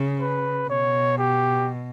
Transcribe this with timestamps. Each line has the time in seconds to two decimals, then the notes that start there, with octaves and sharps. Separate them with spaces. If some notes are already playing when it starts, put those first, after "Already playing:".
Already playing: C#3
0.21 B4
0.69 B2 C#5
1.18 G4